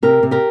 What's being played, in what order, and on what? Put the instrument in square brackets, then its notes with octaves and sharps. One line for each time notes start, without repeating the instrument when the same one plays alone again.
[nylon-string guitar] C3 G4 A#4
C3
G4 A#4